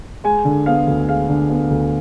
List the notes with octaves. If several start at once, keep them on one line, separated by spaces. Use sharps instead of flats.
G#3 G#5
D3
B3 F5
D2
G#3 F5
D3
B3
D2